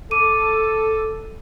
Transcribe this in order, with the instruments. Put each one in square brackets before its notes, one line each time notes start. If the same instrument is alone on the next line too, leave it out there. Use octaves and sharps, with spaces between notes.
[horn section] A4 [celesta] D6 D#7